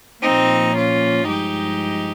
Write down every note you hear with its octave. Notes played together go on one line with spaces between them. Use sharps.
A#2 F3 A#3 C4 D#4
C#4 F4
G2 F3 G#3 D#4 G4